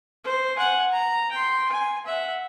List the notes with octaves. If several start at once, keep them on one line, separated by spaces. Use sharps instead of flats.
C5
F#5 G#5
A#5
G5 C6
G#5
E5 F#5